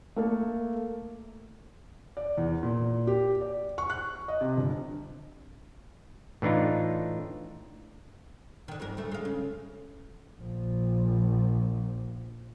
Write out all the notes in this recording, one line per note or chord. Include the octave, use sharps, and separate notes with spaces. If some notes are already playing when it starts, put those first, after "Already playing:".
A3 A#3 A4
D5
E2
A#2
G4
D5
C#6
F#6
D#5
C3
G1
A2 E3 D4 D#4 F4
D3 D#3
F2 G#2 A#4
D2 A3
G#3 F5
C#3
A#1 F3